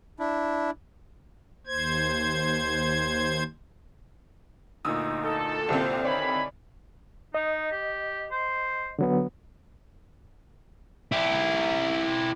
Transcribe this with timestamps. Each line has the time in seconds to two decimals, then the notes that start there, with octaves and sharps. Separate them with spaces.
0.19 D4 E4
1.67 D#2 C5 G#6
4.85 D2 A#2 D#4 D#6 E6
5.23 A4
5.69 C2 A#2 D3 C4 G4 C5
6.05 D#3 C#5 D5 G#5 B5
7.34 D#4 D#5
7.72 G4
8.31 C5
8.99 D3 F#3 B3
11.12 E4 G4